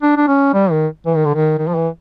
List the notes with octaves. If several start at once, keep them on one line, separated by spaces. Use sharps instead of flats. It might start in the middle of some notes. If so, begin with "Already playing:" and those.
D4
D4
C#4
G3
D#3
E3
D#3
D3
D#3
D#3
F3
E3